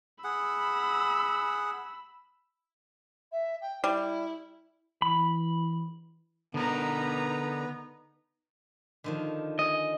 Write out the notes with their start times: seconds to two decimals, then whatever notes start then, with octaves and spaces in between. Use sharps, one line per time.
0.24 G#4 F#5 B5 E6
3.32 E5
3.61 G5
3.84 G3 E4
5.02 E3 B5
6.54 D3 B3 D#4 A#4 B4 A#5
9.04 D3 D#3 F3
9.59 G#4 D#5